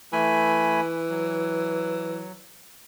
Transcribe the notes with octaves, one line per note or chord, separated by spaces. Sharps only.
E3 A3 G#5 B5
F#3